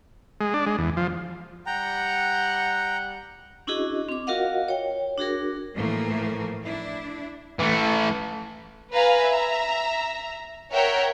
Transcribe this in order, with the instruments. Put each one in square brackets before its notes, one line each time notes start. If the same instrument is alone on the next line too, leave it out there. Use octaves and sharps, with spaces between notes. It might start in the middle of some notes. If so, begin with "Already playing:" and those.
[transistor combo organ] G#3
D4
G#3
E2
F3
[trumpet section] G3 F#5 [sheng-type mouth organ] G5 A#5
[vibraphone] C#4 D4 E4 F#4 G#4 D#5
C4 D6
F4 F#4 A#4 D#5 F5 F#5
C#5 G5
D4 F#4 G#4 A#4
[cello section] A2 E3 F3 A3 A#3
D4 E4
[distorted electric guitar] E3 A3
[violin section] B4 F5 G#5 A#5
E5 A#5
A#4 C#5 E5 F#5 G5